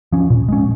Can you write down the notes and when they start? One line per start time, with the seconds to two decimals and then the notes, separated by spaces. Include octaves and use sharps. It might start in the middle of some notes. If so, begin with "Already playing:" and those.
0.12 F3 C#4
0.30 A#2
0.49 G#3 C#4